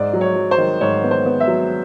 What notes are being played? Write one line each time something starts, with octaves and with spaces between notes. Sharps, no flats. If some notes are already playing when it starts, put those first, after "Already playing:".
Already playing: G#2 D5
F#3
C#5
F#3
C5
D#3
G#2 C#5
B3
C5
B3
E5
F#3